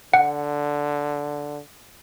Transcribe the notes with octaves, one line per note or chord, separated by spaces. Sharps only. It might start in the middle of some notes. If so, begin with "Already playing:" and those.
D3 F#5